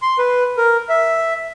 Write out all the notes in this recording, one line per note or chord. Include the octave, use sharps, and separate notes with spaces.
C6
B4
A#4
E5